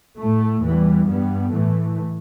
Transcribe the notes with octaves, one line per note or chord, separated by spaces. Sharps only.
A2 A3
E2 E3 G3
G2 G3 B3
A2 E3 A3